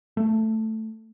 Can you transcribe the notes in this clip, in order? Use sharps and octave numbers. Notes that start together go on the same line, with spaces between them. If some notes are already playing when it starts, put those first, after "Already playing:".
A3